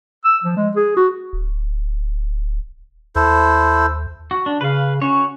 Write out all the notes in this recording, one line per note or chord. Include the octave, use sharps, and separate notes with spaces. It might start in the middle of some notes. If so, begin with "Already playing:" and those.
E6
F3
G#3
G#4
F#4
D1
D#2 E4 A4 C5
F#4
D4
C#3 B4 F5
C#4 F#4 C#5